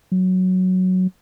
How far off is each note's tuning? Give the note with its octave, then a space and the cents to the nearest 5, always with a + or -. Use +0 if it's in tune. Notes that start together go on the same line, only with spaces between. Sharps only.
F#3 +0